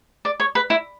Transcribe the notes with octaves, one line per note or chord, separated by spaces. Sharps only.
D5
C#5
B4
E4